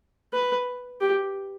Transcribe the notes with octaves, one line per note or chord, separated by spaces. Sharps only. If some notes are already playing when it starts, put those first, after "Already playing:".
B4
G4